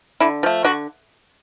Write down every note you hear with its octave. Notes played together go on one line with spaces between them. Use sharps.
D3 E4
F3 A3
D3 F#4